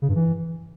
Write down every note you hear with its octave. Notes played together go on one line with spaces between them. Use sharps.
C#3
G2
E3